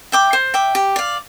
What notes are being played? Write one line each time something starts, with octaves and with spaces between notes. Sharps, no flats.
E5 G5 D6
C5
E5 G5 D6
G4
D5 F5